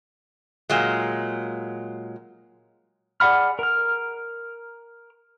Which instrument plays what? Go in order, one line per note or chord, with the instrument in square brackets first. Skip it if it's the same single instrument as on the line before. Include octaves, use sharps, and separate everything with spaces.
[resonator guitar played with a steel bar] A#2 F#3 G#3
[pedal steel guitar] G#4 D5 F#5 B5 F6
A#4 F6